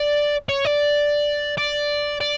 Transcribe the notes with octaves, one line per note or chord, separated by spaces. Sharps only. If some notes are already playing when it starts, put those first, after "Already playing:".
Already playing: D5
C#5
D5
D5
D5